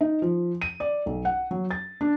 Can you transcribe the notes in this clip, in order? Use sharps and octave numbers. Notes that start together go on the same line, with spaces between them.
D#4
F3
D#7
D5
B1
F#5
F#3
A6
D4